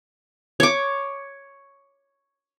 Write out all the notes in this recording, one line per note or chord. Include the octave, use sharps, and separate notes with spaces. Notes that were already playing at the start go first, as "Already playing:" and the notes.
C#5 D6